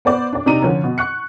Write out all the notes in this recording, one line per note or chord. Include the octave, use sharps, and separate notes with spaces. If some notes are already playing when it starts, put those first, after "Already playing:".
B3 C5 D5
D4 D5
C3 D4 D#4 A#5 D#7
D3 F3 C#4
B2
C#6 F#6 C#7